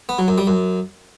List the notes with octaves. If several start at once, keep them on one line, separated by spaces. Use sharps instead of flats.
B3
F#3
F#2
G3
F#2